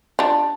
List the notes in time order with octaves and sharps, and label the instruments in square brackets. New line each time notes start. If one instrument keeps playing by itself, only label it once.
[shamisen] D4 F4